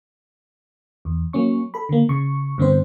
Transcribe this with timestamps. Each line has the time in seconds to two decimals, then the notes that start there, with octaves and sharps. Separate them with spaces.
1.05 E2
1.33 F#3 A#3 C#4 C#6
1.74 A4 B5
1.89 D3 A#3
2.09 C#3 C#6
2.58 G2 D3 B3 C4 D4 C5